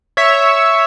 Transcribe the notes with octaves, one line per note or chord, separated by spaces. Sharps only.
C#5 E5